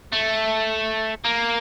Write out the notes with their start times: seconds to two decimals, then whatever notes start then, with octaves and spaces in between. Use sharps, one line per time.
0.13 A3
1.24 A#3